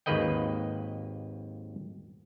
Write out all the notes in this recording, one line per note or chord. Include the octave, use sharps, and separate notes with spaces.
G#1 D#2 A#3 B4 D#5 G5